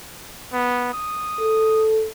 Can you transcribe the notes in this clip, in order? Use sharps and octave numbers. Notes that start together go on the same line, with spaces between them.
B3
D#6
A4